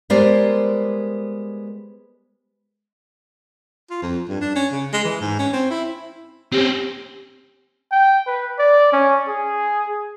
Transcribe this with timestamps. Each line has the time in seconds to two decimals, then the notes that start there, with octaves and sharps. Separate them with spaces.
0.10 G3 G#3 B3 A#4 C5 D5
3.90 F4
4.02 F2
4.29 G2
4.41 D4
4.56 C#4
4.72 C#3
4.93 G#3
5.04 E3
5.20 G#2
5.39 C#4
5.53 C4
5.70 E4
6.52 C4 C#4 G4
7.91 G5
8.27 B4
8.59 D5
8.93 C#4
9.28 G#4